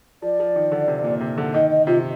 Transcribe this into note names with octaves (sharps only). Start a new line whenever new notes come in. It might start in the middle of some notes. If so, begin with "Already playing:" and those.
F3 D5
F3
D#3
D3
C3
A#2
C3
D3
D#3 D#5
D#5
C3 F4